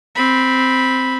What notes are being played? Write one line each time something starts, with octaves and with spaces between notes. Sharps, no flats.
C4 B5